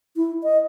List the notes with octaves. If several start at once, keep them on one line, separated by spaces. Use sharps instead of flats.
E4
D#5